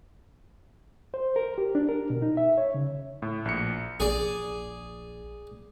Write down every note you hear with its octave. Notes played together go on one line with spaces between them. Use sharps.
C5
A#4
G4
D4
A#4
B2
D#4
E5
C#5
C#3
A2
A#1 C#7
A#1 G#4 D5